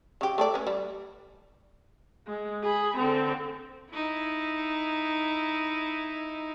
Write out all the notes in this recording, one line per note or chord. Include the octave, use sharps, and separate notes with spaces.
C#3 G4
A3 A4 D5
C#4 B4
G3
G#3
G#4 B5
D3 C4
D#4 E4